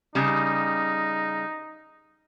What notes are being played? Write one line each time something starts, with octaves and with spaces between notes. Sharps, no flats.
C#3 G3 D#4